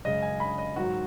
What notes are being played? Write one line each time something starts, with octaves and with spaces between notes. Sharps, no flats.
F#2 C#3 G#3 D#5
G#5
B5
D#5
G#2 D#3 F#3 F#4